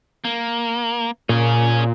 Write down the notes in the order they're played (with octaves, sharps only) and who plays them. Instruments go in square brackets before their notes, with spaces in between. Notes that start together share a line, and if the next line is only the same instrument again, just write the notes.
[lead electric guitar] A#3
[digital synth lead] A#2 [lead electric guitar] C#4 G#4